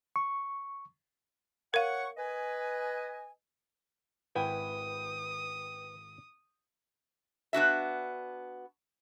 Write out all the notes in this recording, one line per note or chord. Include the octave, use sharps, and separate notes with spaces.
C#6
A#4 C#5 F5 F#5 C#6
B4 D#5 G#5
G#1 E4 B4 G5 G#5 D#6
B3 D4 F#4 E5